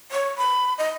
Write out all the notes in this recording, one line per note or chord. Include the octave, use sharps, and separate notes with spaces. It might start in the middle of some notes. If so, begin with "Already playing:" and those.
C#5
B5
D#5